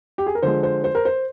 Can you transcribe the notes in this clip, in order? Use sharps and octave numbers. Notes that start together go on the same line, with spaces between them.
G4
G#4
A#4
D3 F3 G#3 C5
C5
C5
A#4
C5